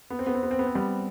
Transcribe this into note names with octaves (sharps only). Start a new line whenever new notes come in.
B3
C4
B3
C4
B3
C4
B3
C4
G3 B3